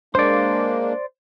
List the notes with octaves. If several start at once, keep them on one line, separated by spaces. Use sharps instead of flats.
G#3 A#3 D4 C5 D5